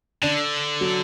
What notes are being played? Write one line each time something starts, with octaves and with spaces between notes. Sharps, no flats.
D3 D4
F#3